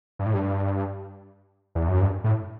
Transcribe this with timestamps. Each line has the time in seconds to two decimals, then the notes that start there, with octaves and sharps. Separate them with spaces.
0.19 G2
0.26 A2
0.34 G2
1.75 E2
1.88 F#2
2.01 G2
2.24 A2